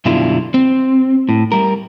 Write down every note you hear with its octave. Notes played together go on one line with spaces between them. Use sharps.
F#2 B2 D3 G3 E4 F4
C4
A2
G3 A#4